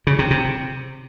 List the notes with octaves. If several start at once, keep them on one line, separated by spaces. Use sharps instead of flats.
C#3
C3
C3